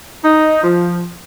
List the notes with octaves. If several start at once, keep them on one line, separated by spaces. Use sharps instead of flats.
D#4
F3